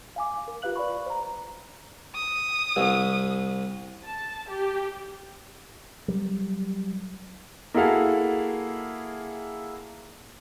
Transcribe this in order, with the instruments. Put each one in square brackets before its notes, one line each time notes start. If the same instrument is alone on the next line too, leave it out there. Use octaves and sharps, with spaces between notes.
[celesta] F5 G#5 D6
A#4
F4 G4 B4 F5 F#6 F#7
B4 D5 F5 B5 C#6
C5 A#5
[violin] D#6
[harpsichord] C2
[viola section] A5
G4
[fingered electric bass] F#3 G3
[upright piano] A#3 E4 F#4 G#4 A4 F5